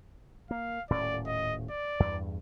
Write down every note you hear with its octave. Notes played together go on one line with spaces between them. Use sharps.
A#3 F5
D#1 A2 C#4 D5
D#5
D5
E2 G2